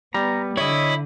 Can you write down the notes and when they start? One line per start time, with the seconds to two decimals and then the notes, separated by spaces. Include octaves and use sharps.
0.14 G3 B3 A#5
0.57 D3 E4 C#5 D#5